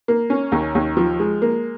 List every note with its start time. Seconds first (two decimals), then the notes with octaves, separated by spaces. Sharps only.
0.08 A#3
0.30 C#4
0.52 D#2
0.75 D#2
0.97 F3
1.20 G#3
1.42 A#3